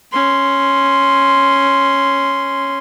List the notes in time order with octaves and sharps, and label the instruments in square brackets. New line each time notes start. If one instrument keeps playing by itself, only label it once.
[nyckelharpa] C#4 C6